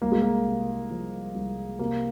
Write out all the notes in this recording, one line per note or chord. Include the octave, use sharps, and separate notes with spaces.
C2 A#3
G#3
A#3
C3
F3
C2
C3 A#3